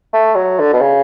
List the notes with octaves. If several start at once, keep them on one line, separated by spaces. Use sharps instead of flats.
A3
F#3
D3
B2
C#3